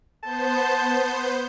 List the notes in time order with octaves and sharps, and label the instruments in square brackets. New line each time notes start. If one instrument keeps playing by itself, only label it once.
[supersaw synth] B3 C5 G6 [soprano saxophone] A5